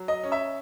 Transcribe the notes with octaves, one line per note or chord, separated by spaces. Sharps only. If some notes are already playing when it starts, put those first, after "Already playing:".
Already playing: F#3
D#5
C#4
E5